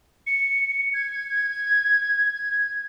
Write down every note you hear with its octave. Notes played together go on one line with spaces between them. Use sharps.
C#7
G#6